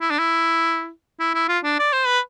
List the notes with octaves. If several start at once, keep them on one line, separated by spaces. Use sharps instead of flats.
E4
D4
E4
E4
E4
F4
D4
D5
C5
B4